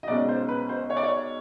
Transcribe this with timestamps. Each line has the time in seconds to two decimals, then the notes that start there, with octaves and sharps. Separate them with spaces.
0.03 D#5
0.08 B1 B2 G#3 C#4 D5
0.29 C5
0.48 B4
0.69 C5
0.90 C#5
0.97 D5
1.03 C#5